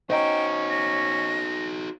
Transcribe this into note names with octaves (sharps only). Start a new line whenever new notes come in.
C#4 D#4 F#4 C5 D#5 G5 A#5
A#6